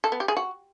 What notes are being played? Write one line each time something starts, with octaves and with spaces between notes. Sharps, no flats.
A4
B3
G4
G#4
F#4